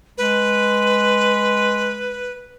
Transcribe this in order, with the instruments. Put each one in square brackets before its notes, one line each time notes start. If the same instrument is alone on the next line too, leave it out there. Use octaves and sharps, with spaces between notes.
[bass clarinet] G#3 [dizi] B4